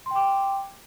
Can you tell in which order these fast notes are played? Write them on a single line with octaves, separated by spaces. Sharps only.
C6 G5 D6